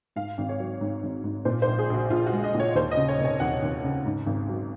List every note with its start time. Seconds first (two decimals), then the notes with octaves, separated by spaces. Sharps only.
0.16 G#2 F5
0.38 G#1
0.49 C#5
0.60 F#3
0.81 G#2
1.03 G#1
1.24 G#2
1.45 A#2 C5
1.62 C5
1.67 A#1
1.79 G#4
1.90 A#1 F#4
2.10 A#1 F4
2.26 F#4
2.32 G#3
2.44 D#5
2.54 A#2
2.60 C#5
2.75 D#2 C5
2.91 D#5
2.97 C#3
3.08 C#5
3.19 F1
3.25 C#5
3.40 D#2 F#5
3.62 D#2
3.84 C#3
4.05 G#2
4.26 G#1
4.49 F#3